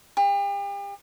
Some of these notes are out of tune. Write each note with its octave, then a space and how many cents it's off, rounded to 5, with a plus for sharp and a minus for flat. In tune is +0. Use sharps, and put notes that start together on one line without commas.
G4 +40